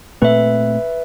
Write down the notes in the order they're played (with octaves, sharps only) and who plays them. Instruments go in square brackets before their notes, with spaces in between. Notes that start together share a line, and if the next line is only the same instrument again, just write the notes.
[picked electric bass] A#2 A3 C4 [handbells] B4 E5